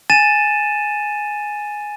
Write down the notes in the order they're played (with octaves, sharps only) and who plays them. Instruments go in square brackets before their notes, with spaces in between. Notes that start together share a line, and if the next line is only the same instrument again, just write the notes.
[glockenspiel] G#5 A6 D#7 E7